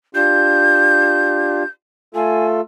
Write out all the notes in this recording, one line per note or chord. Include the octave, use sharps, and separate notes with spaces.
D4 F4 G4 G6
A3 F4 A4 G#5